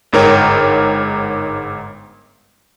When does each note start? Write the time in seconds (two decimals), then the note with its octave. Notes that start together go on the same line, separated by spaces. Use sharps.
0.13 G1 G#2 A#4 C#5 G5